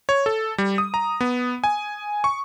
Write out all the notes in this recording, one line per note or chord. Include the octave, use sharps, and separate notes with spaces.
C#5
A4
G3
D#6
A#5
B3
G#5
C#6